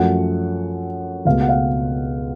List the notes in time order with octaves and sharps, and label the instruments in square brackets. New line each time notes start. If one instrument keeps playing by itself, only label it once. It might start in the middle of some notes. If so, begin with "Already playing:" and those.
Already playing: [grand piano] F#2 F3 A3 F#5
C#2 B2 A3 F5
F#5
F5